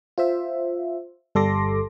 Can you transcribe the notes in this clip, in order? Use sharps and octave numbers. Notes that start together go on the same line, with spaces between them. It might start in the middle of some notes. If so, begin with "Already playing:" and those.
F4 C5 E5
G1 G3 A4 C6 D6 A#6